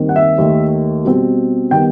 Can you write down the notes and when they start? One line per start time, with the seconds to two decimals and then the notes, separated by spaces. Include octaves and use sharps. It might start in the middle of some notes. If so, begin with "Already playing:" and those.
Already playing: D#2 D#3 G3 C4
0.09 F#5
0.16 E5
0.38 D#2 D#3 A3
1.05 B2 G3 C4
1.71 D#3 G3 B3 G5